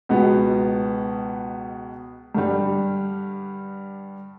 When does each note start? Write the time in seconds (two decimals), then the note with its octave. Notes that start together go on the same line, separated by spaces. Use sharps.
0.09 C#2 B2 G#3 B3
2.35 G2 D3 G3